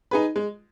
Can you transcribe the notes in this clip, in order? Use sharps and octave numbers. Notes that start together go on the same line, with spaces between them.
D#4 G#4 B4
G#3